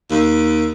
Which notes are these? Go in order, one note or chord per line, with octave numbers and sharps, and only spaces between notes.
D#2